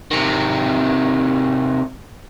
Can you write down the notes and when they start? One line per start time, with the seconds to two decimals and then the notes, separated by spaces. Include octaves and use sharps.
0.11 C3 D#3